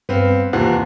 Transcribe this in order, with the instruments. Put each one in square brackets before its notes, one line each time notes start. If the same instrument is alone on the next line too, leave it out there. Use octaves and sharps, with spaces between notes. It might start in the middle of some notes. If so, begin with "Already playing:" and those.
[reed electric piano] G2 [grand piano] B3 C4 F5
[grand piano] D#2 C3 E3 [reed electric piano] F4 F#5